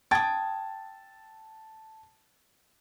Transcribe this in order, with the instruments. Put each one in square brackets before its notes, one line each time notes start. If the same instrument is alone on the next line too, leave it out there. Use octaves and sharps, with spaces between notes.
[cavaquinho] G5 D#6 [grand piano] A5 G#6 A6